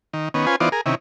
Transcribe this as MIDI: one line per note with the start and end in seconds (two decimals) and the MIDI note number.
0.13 0.29 51
0.34 0.46 51
0.34 0.46 59
0.34 0.46 61
0.46 0.56 61
0.46 0.56 65
0.46 0.56 71
0.46 0.56 72
0.46 0.56 80
0.60 0.69 52
0.60 0.69 59
0.60 0.69 63
0.60 0.69 65
0.60 0.69 72
0.60 0.69 74
0.72 0.81 68
0.72 0.81 70
0.86 0.95 48
0.86 0.95 51
0.86 0.95 61
0.86 0.95 64